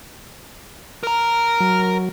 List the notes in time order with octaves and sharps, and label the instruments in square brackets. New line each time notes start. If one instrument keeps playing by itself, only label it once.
[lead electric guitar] A#4 A#5
[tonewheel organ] F#3